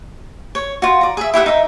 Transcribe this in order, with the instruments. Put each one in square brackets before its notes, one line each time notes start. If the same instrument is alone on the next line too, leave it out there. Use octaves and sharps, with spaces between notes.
[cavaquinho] C#5
F4 F#4
D5 A#5
G#4 E5
E4 G4 E5 F#5
D#4 E5